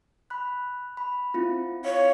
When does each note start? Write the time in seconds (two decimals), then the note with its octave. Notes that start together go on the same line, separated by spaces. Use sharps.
0.30 B5 F#6
0.97 B5
1.34 C4 E4 F4
1.85 C#5 F5